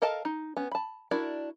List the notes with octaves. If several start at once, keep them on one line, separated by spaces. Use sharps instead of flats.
A4 A#4 D#5 F5 A5
D#4
B3 C#4
A5 B5
D4 E4 F#4 A#4 D5